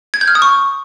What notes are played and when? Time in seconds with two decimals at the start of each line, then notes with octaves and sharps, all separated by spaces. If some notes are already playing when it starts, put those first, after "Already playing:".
0.14 G#6
0.21 G6
0.28 F6
0.35 D#6
0.42 C#6